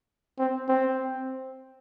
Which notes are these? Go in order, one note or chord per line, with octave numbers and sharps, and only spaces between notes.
C4
C4